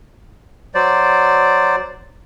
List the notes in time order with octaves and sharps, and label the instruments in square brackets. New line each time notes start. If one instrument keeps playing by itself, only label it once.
[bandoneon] F#3 C5 D5